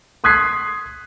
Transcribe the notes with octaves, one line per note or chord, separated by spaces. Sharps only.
C6 D#6 F#6 G#6 B6 C7